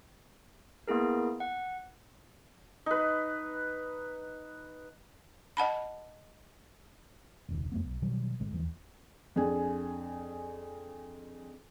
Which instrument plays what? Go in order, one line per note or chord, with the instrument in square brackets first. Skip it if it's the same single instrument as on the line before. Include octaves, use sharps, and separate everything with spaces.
[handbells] A#3 B3 E4 G#4 A#4
F#5
[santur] D#4 B4
[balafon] D#5 F#5 A5 B5
[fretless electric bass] E1 C#2 D#3
F2 A3 B3
B1
B2 D#3 F#3 G3
G#1 D3 G#3
D#2 E3 F3
[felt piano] F2 D4 G#4 G#5